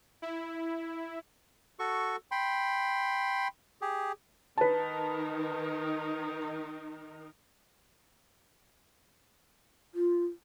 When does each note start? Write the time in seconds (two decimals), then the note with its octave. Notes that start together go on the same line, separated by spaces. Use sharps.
0.22 E4
1.79 F#4 A4 C#6
2.31 G5 B5 C6
3.81 G4 G#4
4.58 D#3 D#4 A#4 B4 A5
9.95 F4